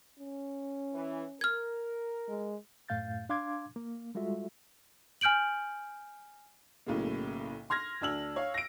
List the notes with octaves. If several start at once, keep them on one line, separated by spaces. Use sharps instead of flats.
C#4
E3
A#4 F6 G#6
G#3
F#2 A2 A3 F5 G6 A6
D4 F5 C6 D6 G#6
A#3
G3 G#3 F4 F#4 A4 E5
G#5 F6 G6 D7 F#7
B1 A2 C#3 A#3
C6 F6 G#6 A#6
D2 D4 E6 F#7
C#5 F5
A#6 D7